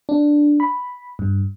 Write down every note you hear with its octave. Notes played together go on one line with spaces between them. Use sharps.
D4
B5
G2